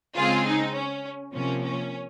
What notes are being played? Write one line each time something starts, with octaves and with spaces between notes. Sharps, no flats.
C#3 G#3 C4 F4 G#4
D#4
C#4
C3 F3 A#3 C#4
C#4